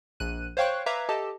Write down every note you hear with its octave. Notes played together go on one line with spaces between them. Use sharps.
A#1 F#6 D#7
C5 C#5 F5 G5 C#6 F#6
B4 E5 F5 A#5 D6 G#6
G4 A4 D#5 A5